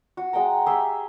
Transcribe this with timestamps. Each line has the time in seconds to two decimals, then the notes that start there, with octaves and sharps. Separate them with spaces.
0.17 F#4
0.33 G#3 F#5 G5 A#5
0.66 G4 G#4 E5 C6